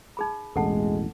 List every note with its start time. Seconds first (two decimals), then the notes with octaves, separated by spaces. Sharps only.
0.17 D#4 G#4 B5
0.56 E1 A1 G#3 A4 F#5 A5